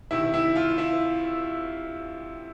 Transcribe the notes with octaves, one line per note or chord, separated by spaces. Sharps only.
D2 C3 D#3 E4 E5
E4 E5
F4 F5
E4 E5